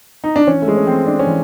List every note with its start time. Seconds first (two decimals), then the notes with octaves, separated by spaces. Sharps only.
0.24 D#4
0.36 D4
0.47 E3 C#4
0.62 A3
0.68 G#3
0.77 C#4
0.87 E3 C4
1.06 D4
1.19 C#4
1.27 E3